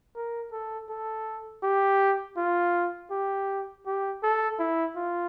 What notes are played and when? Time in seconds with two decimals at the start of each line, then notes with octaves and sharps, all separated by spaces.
0.16 A#4
0.52 A4
0.89 A4
1.63 G4
2.37 F4
3.11 G4
3.86 G4
4.23 A4
4.59 E4
4.96 F4